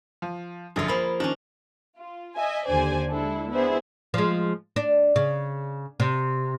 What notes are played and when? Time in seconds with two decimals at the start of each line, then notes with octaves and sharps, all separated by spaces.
0.22 F3
0.76 A#1 F#2 D3 F4 G#4
0.88 F3 A#3 B5
1.20 D#3 C#4 D4
1.97 F4
2.36 D#5 E5 G#5
2.66 D#2 D3 G4 C5 D5 G#5
3.09 G#3 D4 E4 A4
3.50 B3 D4 E4 G#4 C5 E5
4.14 F3 G#3
4.76 D4
5.16 C#3
6.00 C3